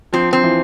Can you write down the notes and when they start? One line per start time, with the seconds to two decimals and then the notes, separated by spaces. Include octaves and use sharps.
0.13 F3 C4
0.33 C4
0.43 E3